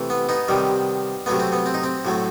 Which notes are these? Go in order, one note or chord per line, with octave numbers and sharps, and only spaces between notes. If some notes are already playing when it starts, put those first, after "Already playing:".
Already playing: C3 E3 A3
B3
B3 D#4
C3 D#3 G3
C3 F#3 A3 B3
C4
B3
C4
D#4
C4
A2 F#3 A3